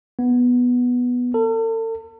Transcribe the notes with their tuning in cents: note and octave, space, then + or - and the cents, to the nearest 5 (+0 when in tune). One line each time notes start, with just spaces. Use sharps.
B3 -5
A4 +40